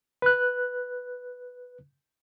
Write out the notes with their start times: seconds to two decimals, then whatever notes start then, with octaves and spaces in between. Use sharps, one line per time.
0.22 B4 F#6